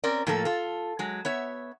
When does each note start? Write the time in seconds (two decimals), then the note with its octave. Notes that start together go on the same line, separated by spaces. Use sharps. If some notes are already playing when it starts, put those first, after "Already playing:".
0.04 C4 C#4 A#4 D5
0.27 A2 F3 A#3 F4 A4
0.45 F4 A4
0.99 F#3 G#3
1.25 B3 C#5 E5